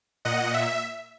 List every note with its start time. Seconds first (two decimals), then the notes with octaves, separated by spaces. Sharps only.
0.25 A#2 D#5 F#5
0.54 E5